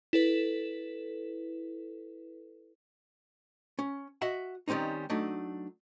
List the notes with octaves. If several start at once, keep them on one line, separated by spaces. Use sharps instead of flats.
E4 A4 B4
C#4
F#4 D#5 E5 F#5
D#3 G3 C4 C#4 D#4
F#3 A3 D4 D#4